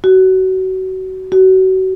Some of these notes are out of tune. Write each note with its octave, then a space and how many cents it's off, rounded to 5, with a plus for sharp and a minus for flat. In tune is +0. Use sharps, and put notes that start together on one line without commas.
F#4 +25
F#4 +30